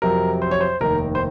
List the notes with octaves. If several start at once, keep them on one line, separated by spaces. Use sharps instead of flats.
F2 C3 F#3 A#4
C5
C#5
C5
F1 D#2 D#3 A#4
C5